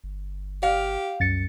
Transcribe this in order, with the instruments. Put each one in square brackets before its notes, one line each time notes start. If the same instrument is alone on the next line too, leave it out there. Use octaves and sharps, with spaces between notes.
[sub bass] G1
[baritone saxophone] G4 [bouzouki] F5
[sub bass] C2 [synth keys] F#2 A6 C#7